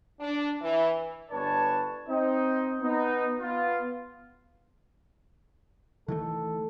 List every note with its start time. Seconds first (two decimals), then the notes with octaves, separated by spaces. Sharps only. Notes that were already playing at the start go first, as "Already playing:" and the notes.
0.21 D4
0.62 E3
1.31 G1 D4 B4 C#5 A5
2.07 C4 D#4
2.81 B3 D#4
3.39 B3 F4
6.08 D#3 E3 A3 A4